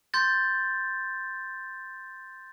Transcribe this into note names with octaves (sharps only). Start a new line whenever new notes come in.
C6 G6 A6